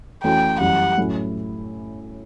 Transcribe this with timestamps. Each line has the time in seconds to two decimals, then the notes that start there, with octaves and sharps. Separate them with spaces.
0.23 E3 A3 C#4 F#4 G5
0.60 F#2 E3 G3 F#5
0.98 A2 F#3 C#4 E4